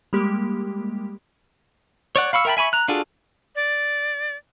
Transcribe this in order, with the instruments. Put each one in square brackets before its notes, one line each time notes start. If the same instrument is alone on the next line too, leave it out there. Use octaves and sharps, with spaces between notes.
[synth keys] G3 G#3 A#3 G4
[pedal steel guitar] C#5 D5 F#5
F5 B5 C#6 E6
A#4 E5 G5 A5 B5
E5 G#5 B5 C#6
A#5 F#6
D4 F4 F#4 G#4 A4
[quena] D5